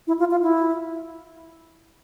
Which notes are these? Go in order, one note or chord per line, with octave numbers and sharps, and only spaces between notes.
E4
F4
F4
E4